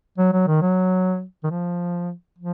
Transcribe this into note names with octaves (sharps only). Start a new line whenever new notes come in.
F#3
F#3
D#3
F#3
D#3
F3
F3